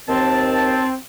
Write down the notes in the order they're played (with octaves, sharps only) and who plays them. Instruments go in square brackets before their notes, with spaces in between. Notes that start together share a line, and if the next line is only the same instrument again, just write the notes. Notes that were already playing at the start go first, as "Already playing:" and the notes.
[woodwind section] D#2 A5 [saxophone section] C4